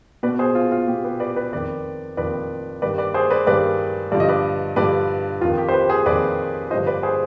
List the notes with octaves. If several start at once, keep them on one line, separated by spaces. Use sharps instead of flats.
B2 B4 D5
G#4 C5
F4
F4
B2 G4
G4 B4
B4 D5
B4 D5
F2 D#3 B4 D5
F2 D#3 B4 D5
G2 D#3 B4 D5
B4 D5
G#4 C5
B4 D5
G2 D#3 B4 D5
G2 D3 F3 D5
D#5
B4 D5
G2 D3 F3 B4 D5
F2 D#3 F4
G4
C5
G4 B4
G#4 C5
F2 D#3 B4 D5
G2 D3 F3 C5 D#5
B4 D5
G#4 C5